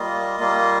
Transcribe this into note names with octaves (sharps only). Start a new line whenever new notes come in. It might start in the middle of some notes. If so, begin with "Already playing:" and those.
Already playing: G3 A#3 F4 D#5
G3 A#3 F4